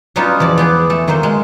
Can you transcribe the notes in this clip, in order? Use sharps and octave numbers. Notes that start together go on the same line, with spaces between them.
F#3 G3 B3 C#4 D#4 F4
E2 F3 D5
B3 G4 G#4
A3 A4
D#3 F#3 A#3 C5
G#3